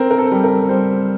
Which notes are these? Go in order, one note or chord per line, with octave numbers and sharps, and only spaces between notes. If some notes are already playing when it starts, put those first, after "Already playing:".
Already playing: C4 A#4
A#4
A4
G3
A#4
G3 C5